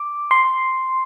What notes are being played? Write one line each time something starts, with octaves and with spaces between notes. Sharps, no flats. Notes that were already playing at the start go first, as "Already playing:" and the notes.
Already playing: D6
C6